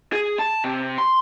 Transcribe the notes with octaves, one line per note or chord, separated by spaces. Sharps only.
G#4
A5
C3
C6